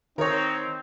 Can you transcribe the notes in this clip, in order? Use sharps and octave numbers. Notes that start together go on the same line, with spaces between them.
D#3 C4 D#4 A#4 C#5